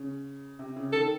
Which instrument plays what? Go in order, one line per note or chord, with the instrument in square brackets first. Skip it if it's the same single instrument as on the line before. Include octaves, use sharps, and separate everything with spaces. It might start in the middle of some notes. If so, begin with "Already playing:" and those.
Already playing: [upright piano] C#3
C3
C#3
[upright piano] D#3 [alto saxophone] A4